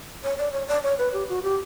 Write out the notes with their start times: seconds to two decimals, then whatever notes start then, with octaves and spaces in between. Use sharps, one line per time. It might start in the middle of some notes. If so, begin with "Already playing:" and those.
0.24 C#5
0.38 D5
0.53 C#5
0.68 D5
0.83 C#5
0.99 B4
1.13 G4
1.29 F#4
1.44 G4